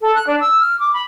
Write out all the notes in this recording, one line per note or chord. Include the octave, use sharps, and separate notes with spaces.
A4
F#6
D4
E6
F6
D6
B5